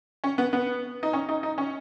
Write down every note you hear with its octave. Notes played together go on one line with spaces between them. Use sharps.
C#4
B3
B3
D#4
C#4
D#4
D#4
C#4